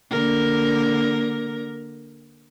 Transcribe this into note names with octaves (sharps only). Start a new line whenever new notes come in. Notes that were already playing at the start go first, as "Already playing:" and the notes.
D3 A#3 A#4